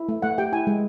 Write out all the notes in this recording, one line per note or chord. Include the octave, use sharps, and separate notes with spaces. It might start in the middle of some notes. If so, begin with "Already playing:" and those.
Already playing: E4
A3
A3 F#5
G4 G5
E4 G#5
G#3